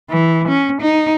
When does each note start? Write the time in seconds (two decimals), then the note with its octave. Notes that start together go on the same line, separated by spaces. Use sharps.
0.10 E3
0.48 C#4
0.81 D#4